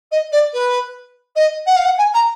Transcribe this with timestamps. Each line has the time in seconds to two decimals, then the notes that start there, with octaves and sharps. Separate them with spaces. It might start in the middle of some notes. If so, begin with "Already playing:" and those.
0.11 D#5
0.32 D5
0.53 B4
1.35 D#5
1.66 F#5
1.76 F5
1.84 F#5
1.98 G#5
2.13 A#5